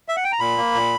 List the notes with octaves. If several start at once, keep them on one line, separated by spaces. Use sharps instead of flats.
E5
F#5
G5
A#5
A#2 B5
A#3
A#2